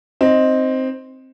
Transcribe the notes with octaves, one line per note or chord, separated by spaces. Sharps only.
C4 D#4